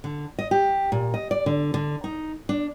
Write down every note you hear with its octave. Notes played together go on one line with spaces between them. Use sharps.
D3
D#5
G4
A#2
D#5
D5
D3
D3
D#4
D4